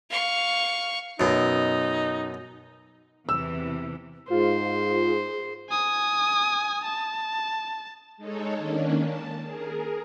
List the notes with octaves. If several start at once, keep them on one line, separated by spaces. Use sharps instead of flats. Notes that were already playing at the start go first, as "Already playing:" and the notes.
F5 C#6
F#2 B2 D#4
E2 C3 E3 E6
G#2 F4 G#4 C5
G#5 D#6
A5
G#3 D#4 A4 C#5
D#3 A#3 C#4 D4
A5
G#4 A#4